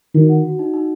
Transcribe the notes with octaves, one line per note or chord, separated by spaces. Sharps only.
D#3 F#4
F#5
F#4
D#4
D#4